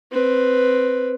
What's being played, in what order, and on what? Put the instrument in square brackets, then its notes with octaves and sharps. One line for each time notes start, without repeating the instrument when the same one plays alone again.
[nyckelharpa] C4 B4